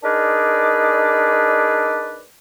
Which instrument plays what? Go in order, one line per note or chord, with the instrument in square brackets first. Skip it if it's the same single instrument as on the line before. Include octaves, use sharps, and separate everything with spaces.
[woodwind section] D4 D#4 G#4 A#4 B4 D5